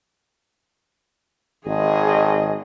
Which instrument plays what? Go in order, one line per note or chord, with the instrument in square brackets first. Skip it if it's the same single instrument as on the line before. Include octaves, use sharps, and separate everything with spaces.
[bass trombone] G#1 [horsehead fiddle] G#4 D#5